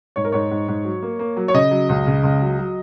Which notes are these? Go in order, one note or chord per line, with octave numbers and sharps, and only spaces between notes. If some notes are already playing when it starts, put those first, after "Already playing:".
G#2 C#5
A#4
G#2 C#5
G#2
G#2
F#3
A#3
A#3
F#3
C#5
C#3 D#5
F#3
C#2
C#3
C#2
F#3
F#3